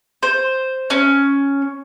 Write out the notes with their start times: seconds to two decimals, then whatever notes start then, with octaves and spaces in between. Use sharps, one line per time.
0.23 C5
0.90 C#4